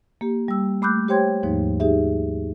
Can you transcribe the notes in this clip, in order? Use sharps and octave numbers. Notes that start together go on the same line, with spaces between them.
A#3 G4
G3 E6
A3 B5 D6 E6 F#6 G6
G4 C5 C#5 G5 C6 G#6
D#2 G#2 F3 A#3 D#4
D#4 G4 G#4 E5